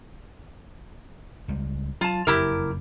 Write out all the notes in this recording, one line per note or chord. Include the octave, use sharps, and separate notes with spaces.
C#2 G3 G#3
F#3 F4 A5
F#1 F2 E4 G4 A#4